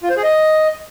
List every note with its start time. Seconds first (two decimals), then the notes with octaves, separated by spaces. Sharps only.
0.03 F4
0.10 C5
0.17 G#4
0.23 D#5